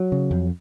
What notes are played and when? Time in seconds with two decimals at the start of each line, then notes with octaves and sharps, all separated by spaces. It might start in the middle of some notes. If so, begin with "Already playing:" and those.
Already playing: F#3
0.12 C#3
0.31 F2